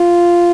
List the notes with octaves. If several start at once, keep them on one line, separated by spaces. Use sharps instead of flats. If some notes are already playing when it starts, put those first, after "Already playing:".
Already playing: F4